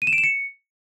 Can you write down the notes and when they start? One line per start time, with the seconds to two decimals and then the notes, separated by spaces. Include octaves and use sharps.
0.02 D#7
0.07 E7
0.13 D7
0.18 E7
0.24 C#7